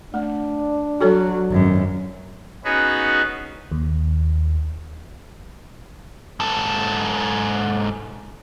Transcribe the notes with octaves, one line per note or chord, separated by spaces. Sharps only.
A3 D4
F#3 F#4 A4 C#5
G#1 F#2
B3 C#4 D#4 F#4 G#4 B4
D#2
G#2 A4